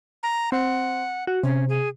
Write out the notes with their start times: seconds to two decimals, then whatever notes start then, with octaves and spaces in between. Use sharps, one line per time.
0.23 A#5
0.52 C4 F#5
1.27 F#4
1.43 C3 C#4
1.69 G#4